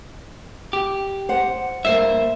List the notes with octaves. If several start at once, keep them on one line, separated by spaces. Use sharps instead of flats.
G4
C5 F#5
G2 A#3 C5 E5